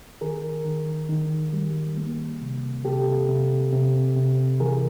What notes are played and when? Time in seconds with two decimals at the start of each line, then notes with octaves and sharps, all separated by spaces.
0.21 D#3 G#4 A#4
0.65 D#3
1.09 D#3
1.53 G3
1.97 A#3
2.41 C3
2.85 C3 G4 A4
3.29 C3
3.73 C3
4.16 C3
4.60 E3 G#4 A#4